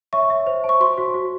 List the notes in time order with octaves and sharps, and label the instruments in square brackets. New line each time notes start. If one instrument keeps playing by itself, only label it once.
[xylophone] C#5 C#6 [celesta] E5
[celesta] E5
C5
A5
[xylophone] C#6
[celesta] F#4 [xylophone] C5 C6
[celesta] F#4
F#4